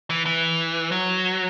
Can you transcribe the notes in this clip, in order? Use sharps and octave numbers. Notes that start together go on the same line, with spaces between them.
E3
E3
F#3